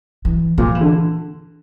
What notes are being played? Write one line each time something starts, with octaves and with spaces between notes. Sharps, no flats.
E3
A#2 F3
E3
D3